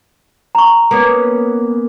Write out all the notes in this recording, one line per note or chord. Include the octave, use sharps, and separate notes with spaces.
A#5 C#6
A#3 B3 C#4